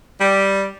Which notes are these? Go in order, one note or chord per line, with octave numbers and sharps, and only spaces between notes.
G3